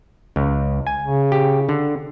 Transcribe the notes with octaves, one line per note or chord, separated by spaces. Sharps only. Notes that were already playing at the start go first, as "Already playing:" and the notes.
C#2
G#5
C#3
G4
D3